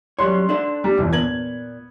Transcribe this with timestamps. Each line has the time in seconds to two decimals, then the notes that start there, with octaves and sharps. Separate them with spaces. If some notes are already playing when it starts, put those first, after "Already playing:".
0.19 F#2 G3 C#5 C6 F#6
0.49 D4 A4 C5
0.84 G3
0.98 G1 E2 A#2
1.12 B3 G#6 F#7